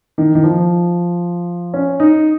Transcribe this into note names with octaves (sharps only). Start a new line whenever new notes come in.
D#3
D#3
F3
C#4
D#4